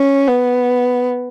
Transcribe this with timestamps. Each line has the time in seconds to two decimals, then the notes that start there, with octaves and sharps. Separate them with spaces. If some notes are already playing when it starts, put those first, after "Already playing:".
Already playing: C#4
0.28 B3